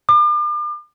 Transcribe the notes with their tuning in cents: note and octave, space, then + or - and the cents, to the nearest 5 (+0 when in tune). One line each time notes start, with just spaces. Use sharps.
D6 +40